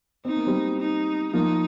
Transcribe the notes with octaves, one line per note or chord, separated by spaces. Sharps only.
C4 D#4
A#3
G3 C4
D#4
F3 A#3 D#4